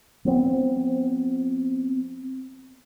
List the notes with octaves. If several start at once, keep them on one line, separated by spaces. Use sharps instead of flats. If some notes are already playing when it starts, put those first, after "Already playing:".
F3 B3 C4